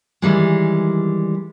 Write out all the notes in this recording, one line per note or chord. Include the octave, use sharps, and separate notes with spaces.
D#3 E3 G3 G#3